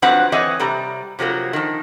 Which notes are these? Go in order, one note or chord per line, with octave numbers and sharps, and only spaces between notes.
G2 F3 F#3 C4 B4 F#5
E3 C4 B4 C#5 D#5
C3 G3 A#5
C3 F3 F#3 A#3
D#3 F3